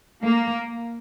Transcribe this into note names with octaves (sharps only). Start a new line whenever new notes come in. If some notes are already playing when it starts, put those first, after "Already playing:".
A#3